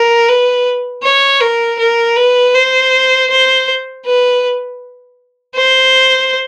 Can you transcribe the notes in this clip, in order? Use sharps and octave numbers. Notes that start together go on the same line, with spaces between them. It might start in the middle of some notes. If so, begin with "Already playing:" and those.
Already playing: A#4
B4
C#5
A#4
A#4
B4
C5
C5
B4
C5